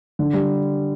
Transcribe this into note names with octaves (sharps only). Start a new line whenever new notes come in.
D3
G3